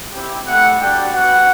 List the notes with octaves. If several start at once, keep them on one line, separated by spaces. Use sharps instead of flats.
C4 E4 G4
A3 E4 G4 F#5
G3 D4 F#4 G5
B3 F#4 F#5